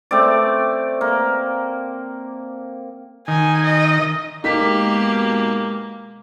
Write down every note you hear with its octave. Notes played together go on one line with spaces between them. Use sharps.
A3 C4 D5
A#3
D#3 G#5
D#5
B2 G#3 A#3 D#4 G4 A#4 B6